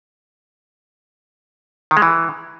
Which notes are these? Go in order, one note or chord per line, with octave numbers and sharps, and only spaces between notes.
D#3
G#3
E3